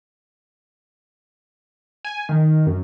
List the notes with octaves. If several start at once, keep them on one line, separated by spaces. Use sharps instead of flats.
G#5
D#3
F#2